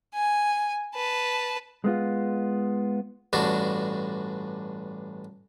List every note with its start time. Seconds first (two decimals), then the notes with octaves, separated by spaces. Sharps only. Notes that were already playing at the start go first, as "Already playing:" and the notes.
0.14 G#5
0.95 B4 A5
1.84 G#3 B3 F4
3.33 A1 G2 D4 F#4